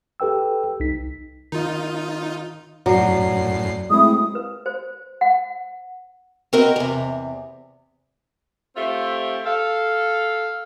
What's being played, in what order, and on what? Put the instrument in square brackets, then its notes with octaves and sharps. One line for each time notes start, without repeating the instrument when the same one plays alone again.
[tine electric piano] G4 A4 B4 G5 E6
C2 D#4 B6
[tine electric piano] D#3 [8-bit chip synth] D#4 F4
[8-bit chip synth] F#2 A2 C7 [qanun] F#3 [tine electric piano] D5
[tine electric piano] G#3 A3 C4 [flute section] E4 D#6
[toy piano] B4
C5
F#5
[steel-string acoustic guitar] C4 F#4 A#4 B4 D#5
E2 C3
[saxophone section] A3 C4 F4 G4 C5 E5
A4 F5